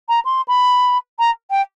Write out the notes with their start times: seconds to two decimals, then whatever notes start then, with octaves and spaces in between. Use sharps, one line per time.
0.09 A#5
0.25 C6
0.48 B5
1.19 A#5
1.51 G5